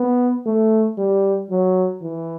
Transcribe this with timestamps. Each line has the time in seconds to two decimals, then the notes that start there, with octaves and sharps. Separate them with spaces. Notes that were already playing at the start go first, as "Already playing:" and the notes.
Already playing: B3
0.46 A3
0.98 G3
1.51 F#3
2.02 E3